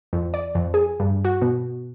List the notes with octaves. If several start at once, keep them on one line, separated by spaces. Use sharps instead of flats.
F2
D5
F2
G#4
G2
F#4
B2